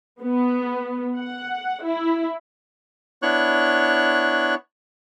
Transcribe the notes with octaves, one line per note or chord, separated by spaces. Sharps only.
B3
F#5
E4
B3 D4 E4 C#5 C#6 F#6